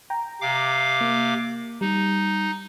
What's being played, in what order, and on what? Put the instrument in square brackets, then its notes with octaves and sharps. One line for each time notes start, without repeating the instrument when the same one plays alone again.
[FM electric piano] G5 A#5
[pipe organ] C3 F5 D6
[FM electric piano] A#3
[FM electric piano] G3 [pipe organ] D#4